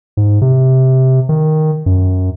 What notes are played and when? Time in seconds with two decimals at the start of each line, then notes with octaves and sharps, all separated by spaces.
0.17 G#2
0.41 C3
1.29 D#3
1.86 F#2